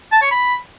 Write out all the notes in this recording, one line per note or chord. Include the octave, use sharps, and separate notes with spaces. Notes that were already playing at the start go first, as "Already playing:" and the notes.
A5
C#5
B5